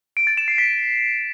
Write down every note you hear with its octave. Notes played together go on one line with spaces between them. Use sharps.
D7
A6
E7
C7
B6